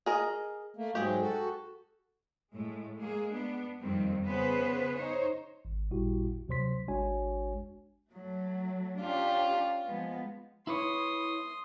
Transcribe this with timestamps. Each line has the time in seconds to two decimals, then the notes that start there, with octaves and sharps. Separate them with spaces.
0.06 G#4 A#4 D#5
0.76 A3 A#3
0.95 G#2 F#3 G#3 G4 G#4
1.21 F#4 A4
2.52 A2 G#3 A3
2.98 G#3 A#3 G#4
3.33 B3 D4
3.79 F2 D#3 G3 A#3 C4
4.25 C#3 B3 G#4 B4 C5
4.96 D#4 C5 C#5
5.65 G#1
5.91 A1 A#2 G3 E4 F#4 G4
6.48 D2 C3 F#3 C5 C6 B6
6.88 G#1 G#3 D4 F#4 C#5 G#5
8.13 F#3 A3
9.01 C#4 D4 F4 G4
9.85 F3 G#3 B3
10.67 E4 B4 C#5 C6 D#6